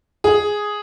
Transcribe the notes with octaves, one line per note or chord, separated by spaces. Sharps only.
G#4